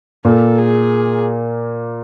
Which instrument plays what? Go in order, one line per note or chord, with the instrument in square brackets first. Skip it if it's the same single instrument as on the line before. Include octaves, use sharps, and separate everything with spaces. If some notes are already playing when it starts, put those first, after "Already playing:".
[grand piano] A#2 A#3 [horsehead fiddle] A4
[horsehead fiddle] G#4